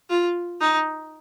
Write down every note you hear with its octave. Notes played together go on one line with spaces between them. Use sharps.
F4
D#4